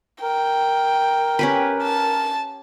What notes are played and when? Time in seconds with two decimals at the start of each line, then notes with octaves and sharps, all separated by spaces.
0.23 A#4 G5
1.39 C#4 G4 B4
1.82 A5